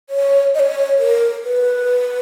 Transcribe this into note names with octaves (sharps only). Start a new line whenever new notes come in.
C#5
D#5
C#5
A#4
B4